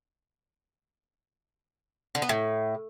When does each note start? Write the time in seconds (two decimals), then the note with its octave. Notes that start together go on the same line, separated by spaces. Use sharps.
2.15 D3
2.22 B3
2.29 A2